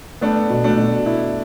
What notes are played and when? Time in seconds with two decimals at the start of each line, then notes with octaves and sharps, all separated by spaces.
0.21 A3 B3 D4
0.50 B2
0.64 A3 D4
0.78 B2
1.06 E4